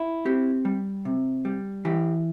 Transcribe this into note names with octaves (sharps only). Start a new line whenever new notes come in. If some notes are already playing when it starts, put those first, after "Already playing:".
Already playing: E4
C4 G4
G3
C3
G3
E3 G4